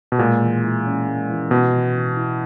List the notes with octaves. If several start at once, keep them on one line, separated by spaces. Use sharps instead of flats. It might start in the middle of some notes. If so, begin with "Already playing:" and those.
B2
A#2 G#3
E3
E4
C#4
G#3
E3
B2 B3
E3
E3
E4